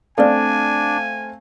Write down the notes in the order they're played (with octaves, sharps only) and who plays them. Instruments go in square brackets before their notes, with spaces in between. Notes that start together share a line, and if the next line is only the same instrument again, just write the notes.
[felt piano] A3 C4 F5 [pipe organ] D4 [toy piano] A4 D5 [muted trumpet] G#5